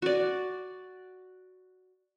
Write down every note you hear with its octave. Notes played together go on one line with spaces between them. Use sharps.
F#4 D5